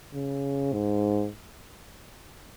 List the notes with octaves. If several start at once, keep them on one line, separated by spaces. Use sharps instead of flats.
C#3
G#2